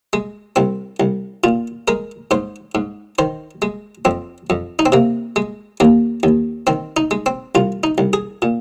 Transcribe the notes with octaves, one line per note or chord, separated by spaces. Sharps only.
G#3
C2 C4
C2
A#2 F4
G#3 A#4
G#2 C5
G#2
D#3 C5
G#3
F2 C4
F2
D#4
C4
C3 A#3
G#3
D#2 A#3
D#2
D#3 C4
D#4
G#3
C4
C2 F4
D#4
C2
G#4
A#2